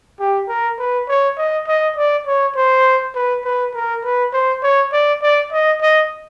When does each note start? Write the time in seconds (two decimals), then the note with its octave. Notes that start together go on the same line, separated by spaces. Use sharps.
0.20 G4
0.49 A#4
0.79 B4
1.08 C#5
1.38 D#5
1.68 D#5
1.96 D5
2.27 C#5
2.56 C5
3.15 B4
3.45 B4
3.74 A#4
4.04 B4
4.33 C5
4.63 C#5
4.93 D5
5.22 D5
5.52 D#5
5.81 D#5